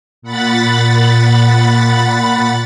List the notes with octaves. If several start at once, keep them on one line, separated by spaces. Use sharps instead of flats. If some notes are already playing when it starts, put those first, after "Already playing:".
A#2 F#5 B5 A6